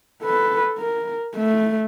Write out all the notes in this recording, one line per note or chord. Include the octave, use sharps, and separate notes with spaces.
A4 B4
A#4
A3